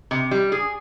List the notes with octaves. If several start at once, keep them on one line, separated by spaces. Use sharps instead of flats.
C3
G3
G#4